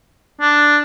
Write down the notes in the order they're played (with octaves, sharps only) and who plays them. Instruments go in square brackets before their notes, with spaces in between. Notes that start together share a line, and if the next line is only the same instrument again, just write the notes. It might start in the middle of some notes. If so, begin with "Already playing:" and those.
[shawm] D4